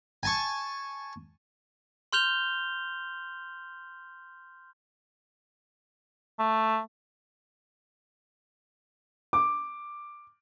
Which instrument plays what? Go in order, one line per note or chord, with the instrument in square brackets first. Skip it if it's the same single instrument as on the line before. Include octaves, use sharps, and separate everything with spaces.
[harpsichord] G#5 A5 C#6
[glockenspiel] C6 F6 G6 F7 G7
[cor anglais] A3
[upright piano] D6